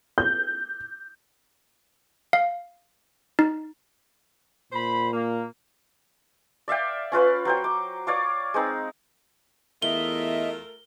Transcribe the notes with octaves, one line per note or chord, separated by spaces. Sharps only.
G6
F5
D#4
A#2 C5 B5
A#3
D5 E5 F5 G5
C#4 F4 B4 F5
F#3 C5 G5
D6
C#5 D5 F5 D6
G#3 C4 D#4
E2 A3 F4 A#4 D#5 E5 G7